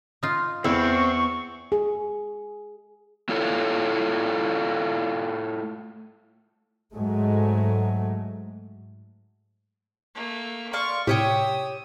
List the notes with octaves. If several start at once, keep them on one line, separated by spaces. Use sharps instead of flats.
D#4 F4
E2 C4 E4 C#6
G#4
A3 E4 F4 A4 C#5
G#2 F#3 G#3 A3
A3 A#3
D5 F5 C6 C#6
A2 C3 G4 C#5 G5 D#6 E6